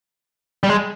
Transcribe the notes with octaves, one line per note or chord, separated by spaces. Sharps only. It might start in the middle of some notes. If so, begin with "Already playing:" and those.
G3
G#3